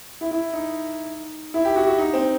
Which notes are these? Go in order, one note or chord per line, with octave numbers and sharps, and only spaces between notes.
E4
E4
D#4
E4
G4
F#4
F#4
D#4
C4